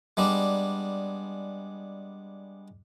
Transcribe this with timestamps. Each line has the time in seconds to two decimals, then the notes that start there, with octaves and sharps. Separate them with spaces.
0.17 G3 G#3 B3 D4